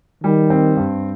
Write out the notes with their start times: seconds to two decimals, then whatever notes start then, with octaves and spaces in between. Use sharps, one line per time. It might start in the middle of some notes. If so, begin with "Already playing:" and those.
0.24 D#3 G3
0.50 C4
0.77 G2